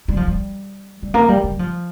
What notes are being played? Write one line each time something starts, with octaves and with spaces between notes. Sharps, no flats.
G3
F3
G3
G3
A#3
G3
G3
F3